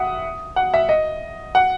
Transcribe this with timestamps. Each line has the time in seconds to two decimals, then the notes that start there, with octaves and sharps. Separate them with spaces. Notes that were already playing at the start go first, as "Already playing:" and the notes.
Already playing: E5 F#5 D#6
0.56 F#5
0.74 E5
0.89 D#5
1.55 F#5